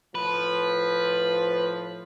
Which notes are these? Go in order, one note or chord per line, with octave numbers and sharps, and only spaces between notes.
A2 F3 B4